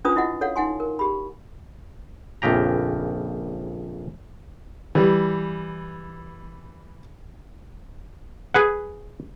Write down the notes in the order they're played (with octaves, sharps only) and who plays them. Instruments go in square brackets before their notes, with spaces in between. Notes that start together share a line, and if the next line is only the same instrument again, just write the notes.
[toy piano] C#4 D4 F4 B4 C5 D#6
E4 F#4 D#5 F#5
A4 C#5 F5 F#5
D#4 F#5 G#5 C6
A#4
G4 B5
[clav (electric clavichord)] A#1 F2 C#3 G4 A#5
[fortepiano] E3 G3
[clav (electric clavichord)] G#4 B4 F#5